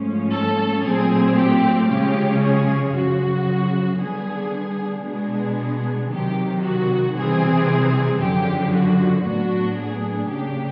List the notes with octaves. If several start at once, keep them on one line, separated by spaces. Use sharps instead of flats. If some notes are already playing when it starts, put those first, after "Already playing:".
Already playing: G#2 F3 A3 C#4
A4
A#2 F#3 A3 C4 G#4
G4
C#3 F3 G#3 C#4 G4
G#4
F#2 C#3 F3 F#4
D3 G3 B3 D4 G#4
B2 G#3 B3 D4 G#4
C3 D#3 F#3 G4
F#4
C3 E3 G3 C4 G#4
F#2 D3 F3 G4
F#4
A2 F#3 B3 D4 F#4
G#4
C#3 F#3 A#3 D4 G4